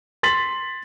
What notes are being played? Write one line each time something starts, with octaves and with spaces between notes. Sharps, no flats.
C6 A6 B6 F#7